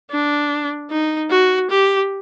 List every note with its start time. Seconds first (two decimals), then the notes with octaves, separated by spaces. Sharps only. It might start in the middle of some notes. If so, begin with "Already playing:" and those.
0.11 D4
0.90 D#4
1.30 F#4
1.70 G4